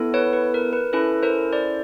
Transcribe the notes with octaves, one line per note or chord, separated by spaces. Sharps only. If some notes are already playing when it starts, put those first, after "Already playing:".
Already playing: B3 E4 A4
B4 C#5
B4
A#4
B4
C#4 E4 A4 B4
A#4 C5
C5 D5